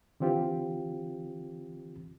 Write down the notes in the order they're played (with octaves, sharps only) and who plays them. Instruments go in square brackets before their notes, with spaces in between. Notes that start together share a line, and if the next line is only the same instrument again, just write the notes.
[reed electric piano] D3 E3 C4 F4 G4